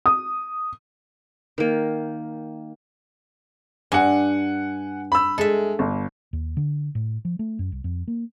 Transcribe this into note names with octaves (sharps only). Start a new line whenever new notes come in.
D#6
D#3 A#3
G2 F#5 G#5
B5 E6
G#3 A4 E5
G1
D#2
D3
A2
F3
A3
F#2
C2
F2
A#3